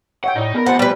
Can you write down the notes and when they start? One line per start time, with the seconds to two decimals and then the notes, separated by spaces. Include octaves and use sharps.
0.24 C#5 E5 F#5 G5
0.36 A2 D#4 D5 D#5
0.54 B3 G#4 A#4
0.66 C3 F3 G4 C5 F#5 A5
0.79 G3 G4 B4 D5